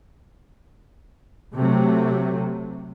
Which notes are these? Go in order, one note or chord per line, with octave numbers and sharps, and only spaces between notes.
C3 F#3 A3